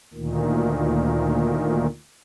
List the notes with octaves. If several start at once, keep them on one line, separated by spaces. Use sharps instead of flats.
D2 A#2 D#3